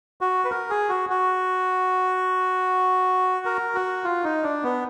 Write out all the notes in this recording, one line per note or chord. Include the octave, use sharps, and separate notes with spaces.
F#4
B4
A#4
G#4
F#4
F#4
A#4
F#4
F4
D#4
D4
B3